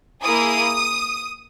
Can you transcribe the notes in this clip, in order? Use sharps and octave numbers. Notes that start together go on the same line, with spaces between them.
A#3 E4 G#4 D#6